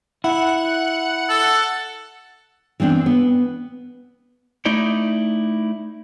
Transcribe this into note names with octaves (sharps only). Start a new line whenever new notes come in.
E4 F#5
A4
E3 B3 C4 D4
B3
A3 D#4 E4 D5